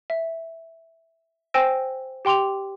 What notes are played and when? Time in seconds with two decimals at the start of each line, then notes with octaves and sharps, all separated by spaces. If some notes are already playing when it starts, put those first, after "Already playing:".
0.10 E5
1.54 C5 G5 G#5 E6 A#6 E7
2.25 G4 G5 C6 D6 F7